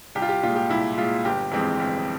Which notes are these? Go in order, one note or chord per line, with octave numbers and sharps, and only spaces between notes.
C2 G4
F4
G4
A#2 G#3 F4
G4
C2 E4
A#2 G#3 F4
G1 G4
F2 E3 G#3 C4
G1